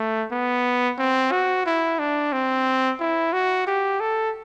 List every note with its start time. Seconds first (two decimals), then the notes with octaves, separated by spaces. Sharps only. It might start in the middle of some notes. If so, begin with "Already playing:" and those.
Already playing: A3
0.32 B3
0.98 C4
1.32 F#4
1.66 E4
1.99 D4
2.33 C4
3.00 E4
3.33 F#4
3.67 G4
4.00 A4